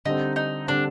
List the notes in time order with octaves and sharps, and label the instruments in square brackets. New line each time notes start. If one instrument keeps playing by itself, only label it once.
[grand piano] D3 G3 C4 [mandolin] D#4
[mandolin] D#4
[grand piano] D3 G3 C4 [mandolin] D4